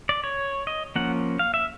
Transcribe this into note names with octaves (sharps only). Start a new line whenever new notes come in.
D5
C#5
D#5
F3 A#3 C#4 F#5
F5
E5